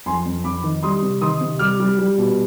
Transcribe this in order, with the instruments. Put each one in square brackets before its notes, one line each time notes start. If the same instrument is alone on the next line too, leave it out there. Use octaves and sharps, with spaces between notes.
[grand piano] F2 G#5 C6
F2
F2 B5 D6
D#3
G3 C6 D#6
C3
D#3 C6 D#6
C3
G3 D6 F6
G3
G3
B2